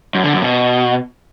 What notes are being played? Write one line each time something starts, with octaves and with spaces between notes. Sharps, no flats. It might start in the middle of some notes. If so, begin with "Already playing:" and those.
F#2
D3
F#2
B2